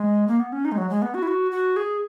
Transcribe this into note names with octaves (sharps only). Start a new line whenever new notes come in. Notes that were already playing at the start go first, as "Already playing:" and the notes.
Already playing: G#3
A#3
B3
C#4
D#4
G#3
F#3
G#3
B3
F#4
E4
F#4
F#4
G#4